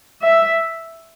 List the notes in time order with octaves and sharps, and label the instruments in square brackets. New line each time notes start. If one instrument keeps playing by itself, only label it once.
[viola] E5